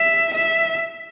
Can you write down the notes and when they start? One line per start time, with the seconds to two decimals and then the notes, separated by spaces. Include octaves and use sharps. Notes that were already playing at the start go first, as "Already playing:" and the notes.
Already playing: E5
0.34 E5